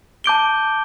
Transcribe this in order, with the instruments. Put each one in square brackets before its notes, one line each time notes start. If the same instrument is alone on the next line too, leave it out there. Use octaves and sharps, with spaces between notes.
[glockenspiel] A5 D6 G6 D7 G7